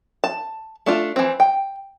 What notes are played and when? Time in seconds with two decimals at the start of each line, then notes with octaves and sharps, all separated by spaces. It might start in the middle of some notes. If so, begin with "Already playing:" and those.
0.24 A5
0.86 A3 D4 F4
1.16 E3 C4
1.40 G5